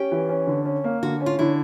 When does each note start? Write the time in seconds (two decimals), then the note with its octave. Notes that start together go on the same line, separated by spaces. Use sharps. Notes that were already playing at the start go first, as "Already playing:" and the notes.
Already playing: C#4 G4
0.12 E3
0.29 C#4
0.47 D3
0.65 C#4
0.84 A#3
1.03 D3 F#4
1.21 C#4
1.26 F4
1.39 D3 E4